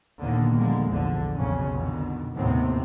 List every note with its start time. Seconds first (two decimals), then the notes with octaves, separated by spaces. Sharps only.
0.20 D#2 A#2 D3 D#3 A#3 B3
0.56 D3 F3 G3 G#3 A#3
0.89 A#1 E2 G#2 D3 E3 F3
1.35 B1 F2 C#3 C#4
1.75 F2 B2 D3 D#3
2.34 D#2 A2 C3 B3 C4